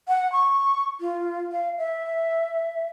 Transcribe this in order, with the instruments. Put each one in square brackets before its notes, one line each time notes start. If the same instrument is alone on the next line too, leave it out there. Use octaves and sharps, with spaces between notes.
[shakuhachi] F#5
C#6
F4
F5
E5